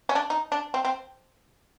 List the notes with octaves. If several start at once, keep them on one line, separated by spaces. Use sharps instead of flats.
C#4
D4
D#4
D4
C4
C4